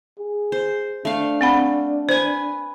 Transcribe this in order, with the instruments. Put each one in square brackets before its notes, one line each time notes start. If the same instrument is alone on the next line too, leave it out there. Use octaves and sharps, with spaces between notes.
[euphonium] G#4
[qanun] C5
[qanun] A3 F5 [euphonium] D4
[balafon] C4 F#5 B5
[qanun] B4 G#5 [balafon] C5